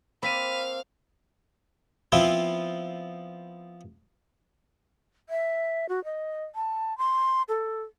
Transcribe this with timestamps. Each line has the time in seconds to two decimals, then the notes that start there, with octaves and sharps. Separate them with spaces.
0.23 A#3 C4 D5 F5 B5 B6 D#7
2.12 F3 B3 C4 E4 F4
5.29 E5
5.89 F#4
6.05 D#5
6.55 A5
6.98 C6
7.49 A4